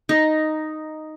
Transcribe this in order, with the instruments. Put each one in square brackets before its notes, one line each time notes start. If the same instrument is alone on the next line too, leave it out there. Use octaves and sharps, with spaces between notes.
[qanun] D#4